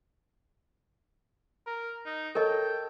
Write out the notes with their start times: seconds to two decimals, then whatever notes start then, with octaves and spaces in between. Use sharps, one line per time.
1.66 A#4
2.06 D#4
2.35 A4 A#4 C#5 D#5 G5